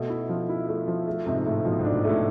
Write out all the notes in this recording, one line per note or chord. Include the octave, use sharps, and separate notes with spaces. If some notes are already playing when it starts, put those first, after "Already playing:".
Already playing: B2 A3
E4
F3
E4
A3
F3
A3
G#2 C3
A2 A3
B2 F3
G#2
D4
A2
A2 A3